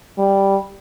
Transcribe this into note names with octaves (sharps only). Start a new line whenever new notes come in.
G3